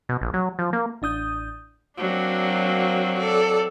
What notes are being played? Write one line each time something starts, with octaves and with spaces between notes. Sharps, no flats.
B2
A#1
F#3
F3
A#3
A1 D4 D#6 G6
F#3 A#3 C4 D4 F#4
A4 D5